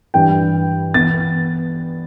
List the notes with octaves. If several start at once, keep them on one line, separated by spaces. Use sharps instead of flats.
G2 E3 G3 G5
E3 B3 A6